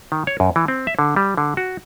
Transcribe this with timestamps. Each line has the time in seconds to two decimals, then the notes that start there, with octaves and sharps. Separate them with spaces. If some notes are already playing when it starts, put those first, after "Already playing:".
0.12 D#3
0.27 C#5
0.40 F#2
0.56 E3
0.68 C4
0.87 E5
0.99 D3
1.16 G3
1.38 D3
1.57 F#4